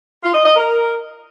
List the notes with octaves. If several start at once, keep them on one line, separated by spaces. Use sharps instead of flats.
F4
D#5
D#5
A#4